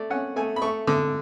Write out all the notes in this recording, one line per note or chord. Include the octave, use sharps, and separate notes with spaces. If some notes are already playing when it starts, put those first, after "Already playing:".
Already playing: A3 D5
C#4 F#5
A3 G#5
B5
A3 C#6
D3 D6